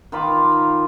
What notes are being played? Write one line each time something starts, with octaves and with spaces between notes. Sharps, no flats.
D#3 F4 B5 D6